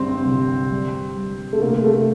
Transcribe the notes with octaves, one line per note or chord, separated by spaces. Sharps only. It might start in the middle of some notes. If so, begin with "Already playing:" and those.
Already playing: G1 G3 C4
C2
G3
G3
A3
C3 A#3
A3